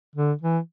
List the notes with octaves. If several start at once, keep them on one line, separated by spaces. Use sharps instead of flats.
D3
E3